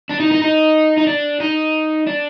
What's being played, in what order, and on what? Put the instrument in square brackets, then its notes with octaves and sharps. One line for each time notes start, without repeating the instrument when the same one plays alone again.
[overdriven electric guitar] D4
D#4
D#4
D#4
D#4
D4
D#4
D4